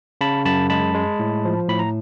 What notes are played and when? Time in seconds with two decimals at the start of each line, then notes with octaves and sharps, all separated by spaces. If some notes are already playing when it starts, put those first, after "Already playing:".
0.21 C#3 A5 B5
0.45 F#2 A5 B5
0.70 G#3 A5 B5
0.94 G#3
1.19 A2
1.45 F3
1.69 A2 B5
1.79 A#5